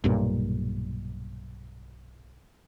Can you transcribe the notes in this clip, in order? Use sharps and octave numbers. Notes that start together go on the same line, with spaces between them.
B1 G2 A#2